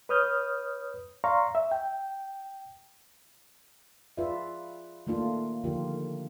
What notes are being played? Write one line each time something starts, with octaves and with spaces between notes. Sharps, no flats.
B4 C#5 D#6 F6 G6
D5 F5 A#5 C6 C#6
E5
G5
F4 G#4 B4 D5 E5
D#3 A3 A#3 D4 F4
D3 D#3 F3 F4 G4 A#4